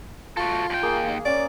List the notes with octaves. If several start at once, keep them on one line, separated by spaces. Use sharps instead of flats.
F4 F#4 A4
D#2 G5
A#3 G#4
C#4 D5 G#5